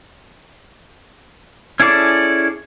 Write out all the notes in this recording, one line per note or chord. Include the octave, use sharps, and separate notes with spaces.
C#4 E4 G#4 A4 D5